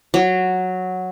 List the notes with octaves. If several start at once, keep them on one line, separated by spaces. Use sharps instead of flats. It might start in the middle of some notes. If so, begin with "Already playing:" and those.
F#3